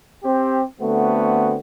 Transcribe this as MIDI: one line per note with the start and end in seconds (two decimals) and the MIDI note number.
0.24 0.63 60
0.24 0.63 67
0.80 1.57 50
0.80 1.57 57
0.80 1.57 59
0.80 1.57 60
0.80 1.57 66